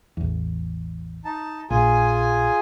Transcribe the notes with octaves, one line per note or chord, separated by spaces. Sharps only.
A1 E2
D#4 A5
A#1 F4 G#4 G#5